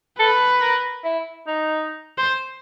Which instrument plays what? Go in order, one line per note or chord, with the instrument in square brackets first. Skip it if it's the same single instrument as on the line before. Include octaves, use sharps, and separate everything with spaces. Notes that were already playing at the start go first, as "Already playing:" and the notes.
[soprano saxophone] A4 [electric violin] B4
[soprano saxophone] A#4
E4
D#4
[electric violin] C5